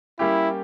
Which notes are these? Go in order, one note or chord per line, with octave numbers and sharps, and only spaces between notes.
G3 A#3 C#4 E4 G4